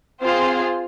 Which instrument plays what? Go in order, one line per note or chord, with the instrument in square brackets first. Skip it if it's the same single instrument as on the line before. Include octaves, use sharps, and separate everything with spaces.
[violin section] C4 F4 G#4 C5 F5